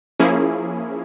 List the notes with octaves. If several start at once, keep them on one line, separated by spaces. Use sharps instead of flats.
F3 A#3 C#4 E4 G#4